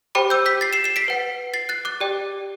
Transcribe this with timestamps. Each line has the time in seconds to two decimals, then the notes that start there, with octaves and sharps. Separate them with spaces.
0.15 G4 C5 G5 B5 D6
0.30 E6 G6
0.46 G6 B6
0.61 A6 C7
0.73 C7 E7
0.84 C7 E7
0.96 B6 D7
1.08 B4 F#5
1.54 A6 C7
1.69 F#6 A6
1.85 D6 F#6
2.00 G4 D5 G5